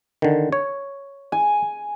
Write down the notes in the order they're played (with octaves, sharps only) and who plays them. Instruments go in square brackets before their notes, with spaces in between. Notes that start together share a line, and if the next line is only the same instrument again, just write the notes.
[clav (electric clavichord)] D3 D#3
C#5
[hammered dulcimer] G#5